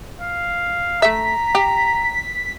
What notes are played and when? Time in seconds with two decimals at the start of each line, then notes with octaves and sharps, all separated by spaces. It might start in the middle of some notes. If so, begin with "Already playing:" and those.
0.21 F5
1.02 A3 E5 A#5 B6
1.55 G4